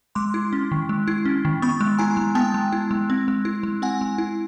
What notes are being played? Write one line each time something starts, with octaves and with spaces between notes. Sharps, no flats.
G#3 C6 D6
E4
C#4
D#3
G#3
E4
C#4
D#3
B3 B5 C#6
G#3
E4 G#5 A#5
G#3
B3 G5 A5
G#3
E4
G#3
C4
G#3
E4
G#3
C4 F#5 G#5
G#3
E4